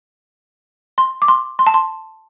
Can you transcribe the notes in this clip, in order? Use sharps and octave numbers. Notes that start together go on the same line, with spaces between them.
C6
D6
C6
C6
A5
C6